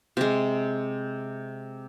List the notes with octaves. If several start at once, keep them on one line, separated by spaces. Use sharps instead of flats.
C3 G#3